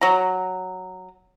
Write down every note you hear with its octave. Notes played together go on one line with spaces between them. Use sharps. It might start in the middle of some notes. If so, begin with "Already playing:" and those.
F#3 A#5